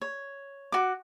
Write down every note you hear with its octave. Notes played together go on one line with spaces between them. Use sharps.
C#5
F#4 D6